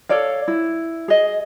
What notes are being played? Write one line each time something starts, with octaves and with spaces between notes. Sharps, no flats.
A4 C#5 D5 F5
E4
G#4 D#5